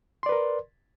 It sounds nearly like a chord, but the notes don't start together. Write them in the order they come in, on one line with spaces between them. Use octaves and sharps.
C6 D5 B4 A#4